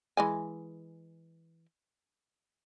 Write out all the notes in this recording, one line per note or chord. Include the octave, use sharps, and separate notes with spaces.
E3 G#3 G#5